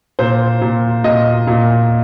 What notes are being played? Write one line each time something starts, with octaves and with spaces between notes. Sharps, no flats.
A#2 C5
A#2
A#2 D#5
A#2